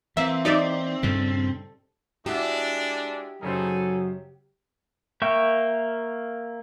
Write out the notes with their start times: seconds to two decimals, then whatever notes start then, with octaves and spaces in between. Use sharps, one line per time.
0.17 E3 A#3 C4 E5
0.45 C4 D#4 G4 C5 D5 E5
1.03 G2 A#2 C#3 A4 G5
2.26 G#3 D4 E4 F#4 G4 E7
3.42 F#2 C#3 F#3 D#4 G#4 A4 C5
5.22 A#3 E5 F5 G5 C#6